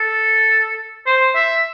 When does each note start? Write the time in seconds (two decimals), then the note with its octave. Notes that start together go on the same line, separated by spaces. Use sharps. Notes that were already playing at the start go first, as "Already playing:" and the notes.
Already playing: A4
1.06 C5
1.35 E5